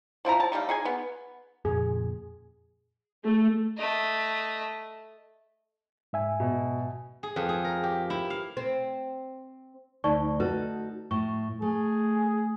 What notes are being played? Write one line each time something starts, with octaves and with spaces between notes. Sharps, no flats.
F3 C4 E4 A#5
A5
G3 A3 D#4 F5
D#4 G#4 G#5
B3
F2 A#2 C#3 G#4
A3
A3 D#5
G#2 E5 G#5
B2
G#4
F2
G#4
A#4
G4
E4
F5
C4
D2 D#4 D5 C#6
D#4 F#4 A4 B4
A2 C#6
A3 G#4